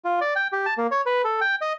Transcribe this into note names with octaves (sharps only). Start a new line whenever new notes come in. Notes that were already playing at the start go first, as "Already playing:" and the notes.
F4
D5
G5
G4
A5
A#3
C#5
B4
A4
G5
D#5